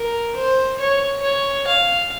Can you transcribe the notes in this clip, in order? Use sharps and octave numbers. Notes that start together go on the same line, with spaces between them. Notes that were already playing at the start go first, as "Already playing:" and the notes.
Already playing: A#4
C5
C#5
C#5
F5